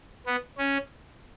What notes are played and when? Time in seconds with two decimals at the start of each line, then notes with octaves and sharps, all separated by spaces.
0.26 B3
0.58 C#4